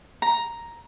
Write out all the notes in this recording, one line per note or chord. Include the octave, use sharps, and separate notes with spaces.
A#5